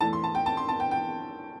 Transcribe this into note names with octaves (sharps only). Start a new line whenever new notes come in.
E2 E3 A3 A5
C6
A5
G5
A5
C6
A5
G5
G5